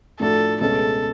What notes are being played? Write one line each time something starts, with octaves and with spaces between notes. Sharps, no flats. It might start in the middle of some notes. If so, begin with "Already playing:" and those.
A2 F3 A3 D4 F#4 A4
C#2 B2 A3 C#4 G#4 A4